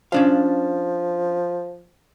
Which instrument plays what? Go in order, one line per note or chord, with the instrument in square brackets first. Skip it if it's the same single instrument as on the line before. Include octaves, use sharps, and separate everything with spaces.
[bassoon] F3 [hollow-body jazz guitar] C#4 D4 F5